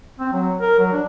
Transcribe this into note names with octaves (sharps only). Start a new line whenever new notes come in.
C4
F#3
A#4
F#3
D4